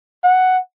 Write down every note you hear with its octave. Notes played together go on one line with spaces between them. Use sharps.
F#5